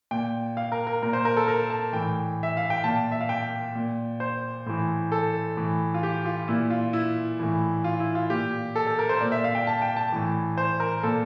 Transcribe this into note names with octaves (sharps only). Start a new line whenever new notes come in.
A#2 G5
F5
A#4
A#4
A#2 A#4
C5
A#4
A4
A#4
A5
A2 E3 G5
E5
F5
G5
A#2 A5
E5
F5
G5
A#2
C5
A2 E3
A4
A2 E3
F4
G4
F4
A#2 E4
F4
E4
A2 E3
F4
E4
F4
A#2 G4
A4
A4
A#4
C5
A#2 D5
E5
F5
G5
A5
G5
A5
A2 E3
C5
A#4
A#2 A4